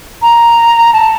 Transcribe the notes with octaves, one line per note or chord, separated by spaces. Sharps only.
A#5
A5